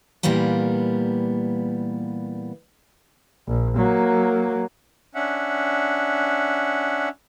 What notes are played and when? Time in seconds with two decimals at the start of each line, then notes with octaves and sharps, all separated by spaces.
0.23 A#2 E3 G3 A#3 B3 A#5
3.48 A#1
3.77 F#3 A#3
5.15 C#4 D4 E5 F#5